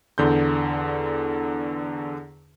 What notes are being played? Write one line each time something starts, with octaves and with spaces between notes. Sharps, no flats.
E2 D3 C6 G6